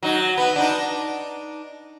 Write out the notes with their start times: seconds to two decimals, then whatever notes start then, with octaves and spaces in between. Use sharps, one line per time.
0.03 F#3 D#4
0.37 B3
0.56 D4 D#4